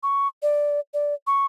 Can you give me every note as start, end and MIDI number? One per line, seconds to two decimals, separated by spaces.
0.03 0.28 85
0.43 0.80 74
0.94 1.14 74
1.27 1.46 85